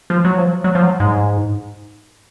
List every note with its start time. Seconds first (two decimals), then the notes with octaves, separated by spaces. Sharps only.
0.10 F3
0.25 F#3
0.38 F3
0.64 F#3
0.75 F3
0.82 F#3
1.00 G#2